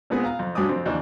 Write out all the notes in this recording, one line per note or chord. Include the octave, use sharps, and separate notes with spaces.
A#2 G#3 B3 C4 G#4
F5 A#5
F2
G2 F#3 G#5 D6 D#6
F2 C4
D#2 E3 D4